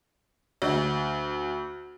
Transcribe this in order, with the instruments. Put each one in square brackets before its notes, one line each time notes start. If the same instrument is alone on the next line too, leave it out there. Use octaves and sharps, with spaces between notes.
[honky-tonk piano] D2